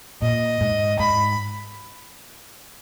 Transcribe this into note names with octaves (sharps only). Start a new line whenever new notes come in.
A#2 D#5
G#2
G#2 B5